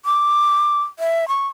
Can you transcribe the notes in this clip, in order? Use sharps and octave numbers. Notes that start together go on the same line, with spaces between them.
D6
E5
C#6